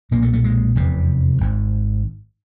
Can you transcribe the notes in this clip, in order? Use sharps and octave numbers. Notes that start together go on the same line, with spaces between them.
B1 A#2 A#3
A3
A3
G#3
F1 E2 C3
G#1 G#2